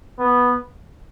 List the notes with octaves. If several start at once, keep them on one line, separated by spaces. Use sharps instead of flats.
B3